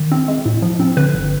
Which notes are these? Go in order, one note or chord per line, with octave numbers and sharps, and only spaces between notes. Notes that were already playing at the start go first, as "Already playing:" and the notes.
Already playing: D#3
C4
G#3
A2
F3
C4
D3 B4
G1